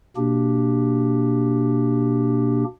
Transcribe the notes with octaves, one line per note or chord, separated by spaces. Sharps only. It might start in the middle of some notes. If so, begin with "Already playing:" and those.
B2 A#3 D4 G4